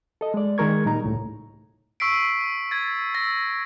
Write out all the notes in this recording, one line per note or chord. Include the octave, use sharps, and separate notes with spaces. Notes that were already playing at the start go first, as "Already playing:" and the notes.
A4 D#5
G#3 D5
D#3 G#3 G#4 A#4 C#6 G#6
A#2 G3 D#4 A#5
C#2 A2
C#6 E6 B6 C7 D7
G#6 A6
E6 A#6